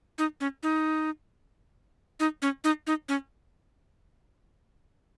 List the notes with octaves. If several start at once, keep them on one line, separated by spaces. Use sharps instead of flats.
D#4
C#4
D#4
D#4
C#4
D#4
D#4
C#4